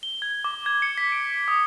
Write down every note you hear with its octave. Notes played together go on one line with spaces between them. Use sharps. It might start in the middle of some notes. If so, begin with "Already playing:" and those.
G7
G#6
D6
G#6
C#7
B6
D7
D#6